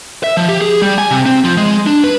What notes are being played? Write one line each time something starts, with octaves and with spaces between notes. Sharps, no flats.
E5
F3
G4
G#4
G3
G#5
C3
C4
F3
G#3
D4
B4